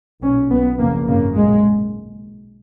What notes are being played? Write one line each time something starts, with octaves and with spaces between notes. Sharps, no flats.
B1 A#2 C#4
B1 A#2 B3
F#1 F2 C#3 A#3
G#1 F#2 C#3 A#3
B1 A#2 G#3